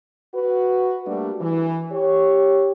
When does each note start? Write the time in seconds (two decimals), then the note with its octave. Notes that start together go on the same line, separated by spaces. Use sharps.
0.35 F#4 B4
1.06 G3 A3 A#3 D4 F#4
1.41 E3
1.92 G4 C#5